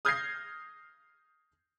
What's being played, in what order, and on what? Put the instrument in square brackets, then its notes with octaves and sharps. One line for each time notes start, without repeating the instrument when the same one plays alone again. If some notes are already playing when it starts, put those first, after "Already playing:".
[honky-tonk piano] D#6 F6 G6 G#6 A#6 C7